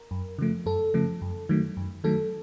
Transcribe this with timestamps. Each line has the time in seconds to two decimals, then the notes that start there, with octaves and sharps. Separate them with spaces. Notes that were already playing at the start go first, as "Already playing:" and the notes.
Already playing: A#4
0.11 F#2
0.39 C#3 F3 A3
0.66 F#2 A4
0.94 C#3 F3 A3
1.22 F#2
1.49 D#3 F#3 A3
1.77 F#2
2.04 D#3 F#3 A3 A4